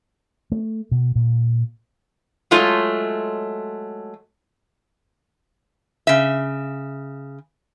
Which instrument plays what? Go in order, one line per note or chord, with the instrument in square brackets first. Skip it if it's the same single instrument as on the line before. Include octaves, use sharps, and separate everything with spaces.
[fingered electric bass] A3
B2
A#2
[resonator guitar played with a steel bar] F#3 G#3 A3 F4 C#5
C#3 E5